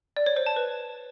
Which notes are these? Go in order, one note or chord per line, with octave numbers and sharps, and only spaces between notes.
D5
C#5
C5
A5
B4